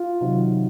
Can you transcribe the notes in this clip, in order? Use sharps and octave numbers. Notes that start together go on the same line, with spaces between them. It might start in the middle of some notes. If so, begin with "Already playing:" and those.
Already playing: F4
C3 D#3 F#3